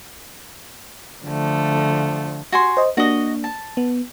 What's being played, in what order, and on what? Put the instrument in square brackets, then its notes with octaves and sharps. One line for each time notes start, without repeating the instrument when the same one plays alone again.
[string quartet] D3 F3 A3
[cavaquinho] F#4 G#5 C6
[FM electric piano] C5 D#5
[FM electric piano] A#3 D4 [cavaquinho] F#4 D#5
[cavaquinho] A5
[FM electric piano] B3